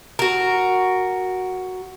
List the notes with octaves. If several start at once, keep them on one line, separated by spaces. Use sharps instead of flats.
F#4 A#4